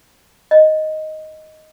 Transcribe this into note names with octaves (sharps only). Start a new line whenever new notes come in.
D#5